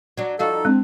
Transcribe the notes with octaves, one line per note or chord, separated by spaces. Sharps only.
F#3 D4
F3 D#4 F#4 A4 F5
G#3 C4 D4